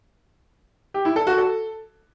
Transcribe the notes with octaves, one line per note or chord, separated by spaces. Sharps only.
G4
E4
A4
F#4
A4